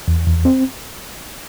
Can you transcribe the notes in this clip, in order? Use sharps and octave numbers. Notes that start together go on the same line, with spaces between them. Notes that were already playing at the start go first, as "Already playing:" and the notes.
E2
E2
C4